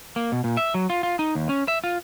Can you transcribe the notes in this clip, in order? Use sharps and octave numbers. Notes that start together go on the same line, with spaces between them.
A#3
B2
A#2
E5
F#3
F4
F4
D#4
D#2
C#4
E5
F4